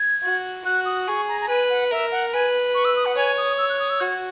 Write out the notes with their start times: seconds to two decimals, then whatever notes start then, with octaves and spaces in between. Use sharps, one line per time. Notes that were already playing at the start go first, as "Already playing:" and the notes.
Already playing: G#6
0.23 F#4
0.65 F#4 F#6
0.85 D#6
1.07 G#4 C#6
1.29 A#5
1.41 A#5
1.49 B4 G#5
1.70 F#5
1.91 A#4 E5
2.12 F#5
2.33 B4 G#5
2.75 C#6
2.85 E6
2.96 D#6
3.05 F#5
3.16 C#5 G#5
3.38 D#6
3.58 E6
3.70 F#6
3.79 D#6
3.90 E6
4.00 F#4 G#6